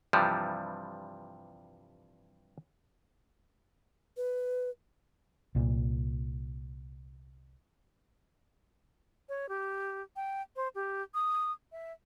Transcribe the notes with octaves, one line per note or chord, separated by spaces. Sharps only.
G2 C3 E3 F3 G3
B4
C2 A#2
C#5
G4
G5
C5
G4
D#6
E5